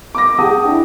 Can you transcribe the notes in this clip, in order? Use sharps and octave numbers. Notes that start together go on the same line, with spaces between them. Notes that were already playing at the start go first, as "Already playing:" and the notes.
D6 A#6
G4 G#4 F#5 G5 A5 D#6
D4 E4